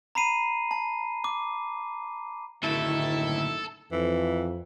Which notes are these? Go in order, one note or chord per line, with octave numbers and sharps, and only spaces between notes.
A#5 B5 C7 D#7
A5
D6
F#1 D2 A2 D#3 E4 A4
F2 E3